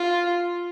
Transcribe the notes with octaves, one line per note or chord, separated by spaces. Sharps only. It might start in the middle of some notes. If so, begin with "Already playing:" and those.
Already playing: F4